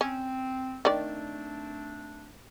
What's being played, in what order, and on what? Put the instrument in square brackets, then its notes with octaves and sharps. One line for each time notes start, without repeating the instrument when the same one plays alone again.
[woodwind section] C4 [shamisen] C#4
[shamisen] D#3 D5 [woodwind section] A3 C4 D4